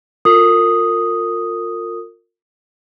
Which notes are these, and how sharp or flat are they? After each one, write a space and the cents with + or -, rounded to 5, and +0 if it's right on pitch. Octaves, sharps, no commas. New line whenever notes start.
F4 +20 A#4 -35 D#6 +0